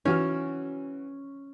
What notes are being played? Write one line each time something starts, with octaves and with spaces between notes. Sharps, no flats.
E3 C#4 F#4 F6